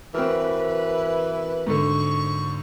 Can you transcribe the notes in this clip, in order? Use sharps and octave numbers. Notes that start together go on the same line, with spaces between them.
E3 C4 F#4 A#4 B4
G#2 D3 C#6